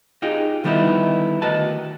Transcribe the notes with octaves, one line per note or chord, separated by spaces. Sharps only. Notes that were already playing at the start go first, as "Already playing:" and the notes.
D#4 F4 G4 G#4 D#5
D3 D#3 G3 B3 D#4 E4
D2 D#3 F#4 B4 D#5 A5